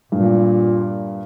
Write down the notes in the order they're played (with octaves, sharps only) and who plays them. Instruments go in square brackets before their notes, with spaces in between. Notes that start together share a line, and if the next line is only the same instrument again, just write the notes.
[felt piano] G2 [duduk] A#2